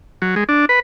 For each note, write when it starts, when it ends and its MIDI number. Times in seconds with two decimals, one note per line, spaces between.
0.22 0.35 54
0.36 0.44 56
0.49 0.65 62
0.69 0.80 71